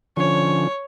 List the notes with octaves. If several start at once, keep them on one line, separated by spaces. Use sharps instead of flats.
D3 F3 C#4 C#5